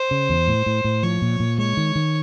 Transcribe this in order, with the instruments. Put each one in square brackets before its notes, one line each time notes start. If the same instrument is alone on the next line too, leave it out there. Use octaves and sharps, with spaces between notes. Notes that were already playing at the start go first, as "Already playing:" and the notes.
Already playing: [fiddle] C5
[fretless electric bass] C#3
E2
A2
A2
A2
[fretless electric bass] F3 [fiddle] C#5
[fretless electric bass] A#2
A#2
[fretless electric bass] G#3 [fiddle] C#5
[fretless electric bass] D#3
D#3